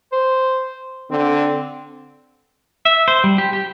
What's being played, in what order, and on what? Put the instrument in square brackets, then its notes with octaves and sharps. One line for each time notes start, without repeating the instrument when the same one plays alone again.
[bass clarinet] C5
[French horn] D3 [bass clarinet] C4
[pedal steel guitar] E5
C5
G3
G4
G4